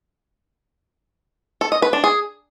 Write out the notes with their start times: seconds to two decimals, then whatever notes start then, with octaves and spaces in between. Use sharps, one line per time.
1.61 A4
1.72 D#5
1.82 B4
1.93 D4
2.04 G#4